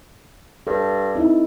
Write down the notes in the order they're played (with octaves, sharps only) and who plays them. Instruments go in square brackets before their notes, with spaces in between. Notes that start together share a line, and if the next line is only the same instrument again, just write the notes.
[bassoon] G2 [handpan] A4
[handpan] C4 D#4 E4